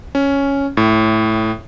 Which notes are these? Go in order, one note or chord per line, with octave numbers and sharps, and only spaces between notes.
C#4
A2